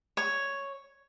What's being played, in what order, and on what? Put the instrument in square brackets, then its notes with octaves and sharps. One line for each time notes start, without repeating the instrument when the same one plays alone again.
[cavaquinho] C#5